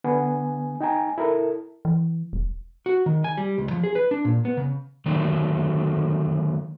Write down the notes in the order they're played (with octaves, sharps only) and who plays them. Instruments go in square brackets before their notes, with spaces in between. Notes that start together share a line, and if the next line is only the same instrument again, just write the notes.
[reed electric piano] D3 B3 G#5
D#4 G5 G#5 A#5
E4 A4 A#4
[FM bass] E3
E1
[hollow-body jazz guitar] F#4
D#3
G#5
G3
C#2
F3
G#4
B4
D4
A#2
B3
C#3
[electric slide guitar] D3 D#3 F#3 A3 A#3 D4